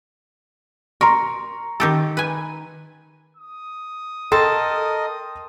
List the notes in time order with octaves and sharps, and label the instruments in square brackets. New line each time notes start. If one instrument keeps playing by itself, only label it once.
[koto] A#4 [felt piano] A#5 C6 C#6
[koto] D#3 G4 A4
B4 G#5
[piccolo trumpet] D#6
[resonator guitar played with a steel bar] A4 [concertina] A#4 D#5 [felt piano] G5 C6 A6